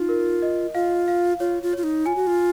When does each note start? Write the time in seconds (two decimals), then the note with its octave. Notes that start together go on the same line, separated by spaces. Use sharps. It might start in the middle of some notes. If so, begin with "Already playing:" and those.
Already playing: D#4 F4
0.09 A#4
0.42 D#5
0.74 F4 F5
1.08 F5
1.40 F4 C#5
1.63 F4
1.73 F4 C#5
1.83 D#4
2.06 F4 G#5
2.16 F#4
2.27 F4